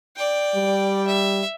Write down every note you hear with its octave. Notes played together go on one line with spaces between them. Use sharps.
D5 G5
G3
E5